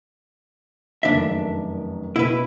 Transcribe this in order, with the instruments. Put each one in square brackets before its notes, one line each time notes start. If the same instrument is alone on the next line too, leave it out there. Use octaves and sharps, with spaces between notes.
[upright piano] F1 F#2 D#3 [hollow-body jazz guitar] D4 E5
[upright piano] B2 [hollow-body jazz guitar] E4 B4